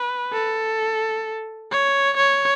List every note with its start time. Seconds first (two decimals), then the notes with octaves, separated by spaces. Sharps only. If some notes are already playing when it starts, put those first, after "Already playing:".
Already playing: B4
0.33 A4
1.71 C#5
2.17 C#5